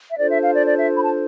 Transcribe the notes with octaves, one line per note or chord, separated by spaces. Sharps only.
E5
D4 F4 A4 C5 D5
E5
F5
D5
D5
E5
B5
A5